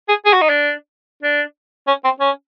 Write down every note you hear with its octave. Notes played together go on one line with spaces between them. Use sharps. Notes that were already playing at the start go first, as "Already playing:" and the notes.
G#4
G#4
F#4
D#4
D4
D4
C#4
C4
C#4